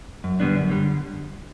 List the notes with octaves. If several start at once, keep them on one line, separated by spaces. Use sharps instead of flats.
F#2
D3 G3 B3 D4
F#2
D3 G3